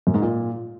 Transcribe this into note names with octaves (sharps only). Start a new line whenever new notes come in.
F#2
G#2
A#2